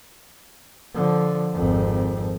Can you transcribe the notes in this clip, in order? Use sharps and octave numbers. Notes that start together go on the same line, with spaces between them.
D3 F3
G#1 F2